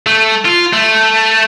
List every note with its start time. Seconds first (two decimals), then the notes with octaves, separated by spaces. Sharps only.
0.07 A3
0.45 F4
0.73 A3